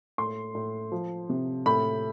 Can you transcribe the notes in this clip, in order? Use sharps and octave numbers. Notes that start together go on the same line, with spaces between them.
A2 C6
A2
F3
C3
A2 B5